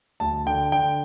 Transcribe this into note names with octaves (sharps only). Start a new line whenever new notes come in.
D2 A5
D3 G5
D3 G5